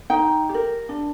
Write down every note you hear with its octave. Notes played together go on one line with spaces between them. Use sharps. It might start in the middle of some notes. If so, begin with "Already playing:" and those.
D#4 G5
G4
A#4
D4